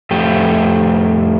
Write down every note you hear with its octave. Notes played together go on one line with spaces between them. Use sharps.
F2 A2 A3 G4